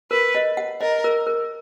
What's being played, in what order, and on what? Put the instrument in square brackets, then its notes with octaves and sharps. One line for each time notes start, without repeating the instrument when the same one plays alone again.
[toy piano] A#4 [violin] B4
[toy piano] D#5
F#5
[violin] A#4 [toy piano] D#5
[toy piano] A#4
A#4